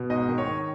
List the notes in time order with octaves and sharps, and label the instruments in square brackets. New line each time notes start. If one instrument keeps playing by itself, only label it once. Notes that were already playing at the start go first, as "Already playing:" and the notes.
Already playing: [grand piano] B2
G#2 D#5
D#3
C#5
D#3